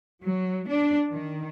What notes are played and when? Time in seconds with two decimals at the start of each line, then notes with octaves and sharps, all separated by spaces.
0.22 F#3
0.68 D4
1.12 D#3